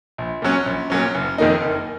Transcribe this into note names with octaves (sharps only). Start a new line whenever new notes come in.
A#1
A#2 F#3 C#4
A#1
A#2 F#3 C#4
F#1
F2 D#3 A#3 D#4
F#1